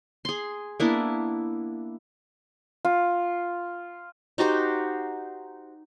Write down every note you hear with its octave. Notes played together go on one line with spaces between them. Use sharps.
G#4 C6
A#3 B3 D4 E4
F4
D#4 F#4 G4 C5